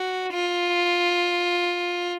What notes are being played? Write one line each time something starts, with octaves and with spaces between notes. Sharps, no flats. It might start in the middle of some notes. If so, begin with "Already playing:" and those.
Already playing: F#4
F4